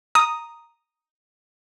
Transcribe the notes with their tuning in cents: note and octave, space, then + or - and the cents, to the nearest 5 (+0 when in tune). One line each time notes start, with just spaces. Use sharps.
A#5 +0 D#6 +0